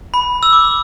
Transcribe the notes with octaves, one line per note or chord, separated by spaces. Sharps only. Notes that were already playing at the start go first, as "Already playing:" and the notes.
B5
E6
D6